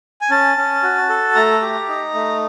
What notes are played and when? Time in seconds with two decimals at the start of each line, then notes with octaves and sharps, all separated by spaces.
0.21 G#5
0.30 C#4 A5
0.57 C#4
0.83 F#4
1.09 A4
1.35 A3 A#5
1.61 G4
1.89 D#4
2.14 A3